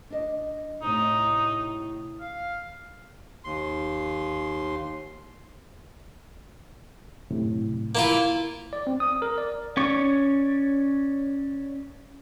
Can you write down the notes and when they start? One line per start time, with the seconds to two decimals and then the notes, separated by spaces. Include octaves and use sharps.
0.10 D4 D#5
0.82 A2 C3 D#4
2.21 F5
3.44 D#2 C6
7.31 F#2 A2 C3
7.95 A#3 E4 F4
8.73 D5
8.87 C4
9.00 D#6
9.22 A#4
9.38 D5
9.77 C#4 C#5 D5 C#6